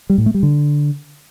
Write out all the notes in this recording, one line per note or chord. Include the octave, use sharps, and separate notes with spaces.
G3
A2
A3
G3
D3